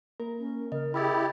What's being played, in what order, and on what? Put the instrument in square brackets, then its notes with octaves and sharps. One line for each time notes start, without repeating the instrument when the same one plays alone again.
[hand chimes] A#3 [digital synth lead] A#4
[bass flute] C#4
[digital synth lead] C#3 [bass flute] A#4 [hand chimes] D#5
[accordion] E4 G4 [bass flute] G#4 [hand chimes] B5 E6 A6